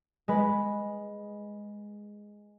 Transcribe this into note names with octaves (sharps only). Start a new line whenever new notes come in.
G#3 B4